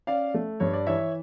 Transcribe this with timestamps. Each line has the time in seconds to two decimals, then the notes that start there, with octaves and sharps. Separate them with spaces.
0.07 C#4 D5 F5
0.34 A3
0.60 G2 C#5
0.73 D5
0.87 E3 C#5 E5